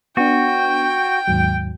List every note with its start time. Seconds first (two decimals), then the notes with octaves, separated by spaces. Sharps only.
0.17 B3 D4 F#4 G5
1.28 D#2 G#2 F#3